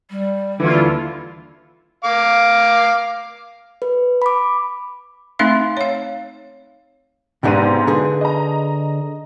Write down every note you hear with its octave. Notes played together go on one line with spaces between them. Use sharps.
G3
D#2 D3 E3 E4 F4
F5 D6
B4
B5 D6
A3 C4 D#4 E5 F5 C6
C#5 F5
B1 G#2 C3 B3 D4 D#7
D3 G#4 B4
D#5 A#5